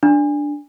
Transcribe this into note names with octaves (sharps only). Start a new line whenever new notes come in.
D4